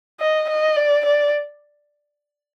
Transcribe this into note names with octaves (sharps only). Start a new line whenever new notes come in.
D#5
D#5
D5
D5